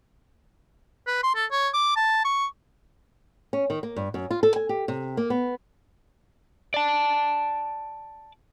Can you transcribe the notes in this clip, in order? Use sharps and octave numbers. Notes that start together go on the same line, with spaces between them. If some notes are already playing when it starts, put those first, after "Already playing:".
B4
C6
A4
C#5
D6
A5
C#6
C#4
D#3
A#3
G2
F#2
F4
A4
G#5
G4
C3
A#3
B3
D5 A5